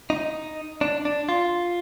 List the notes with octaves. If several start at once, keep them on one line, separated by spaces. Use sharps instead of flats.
D#4
D4
D4
F4